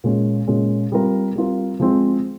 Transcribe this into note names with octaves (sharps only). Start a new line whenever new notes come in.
A#2 G#3 C#4
A#2 G#3 C#4
G3 C4 F4 A#4
G3 C4 F4 A#4
F3 G#3 C4 F4